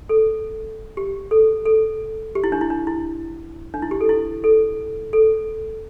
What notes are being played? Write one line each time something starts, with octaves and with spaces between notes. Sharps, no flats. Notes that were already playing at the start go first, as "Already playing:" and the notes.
A4
G4
A4
A4
G4
E4
D4
E4
D4
E4
D4
E4
G4
A4
E4
A4
A4